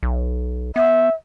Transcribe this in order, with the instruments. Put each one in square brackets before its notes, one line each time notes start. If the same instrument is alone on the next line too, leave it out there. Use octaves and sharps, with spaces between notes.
[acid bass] B1
[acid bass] B3 [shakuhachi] E5